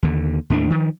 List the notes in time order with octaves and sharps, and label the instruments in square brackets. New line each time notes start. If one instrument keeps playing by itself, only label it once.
[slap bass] D#2 D3
D#2 A2 A3 D4
D#3 F3